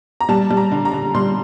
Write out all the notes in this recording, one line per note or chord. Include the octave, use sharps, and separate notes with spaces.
A#5
G3 A5
G3
A#5
D3
A#5
D3
G3 C6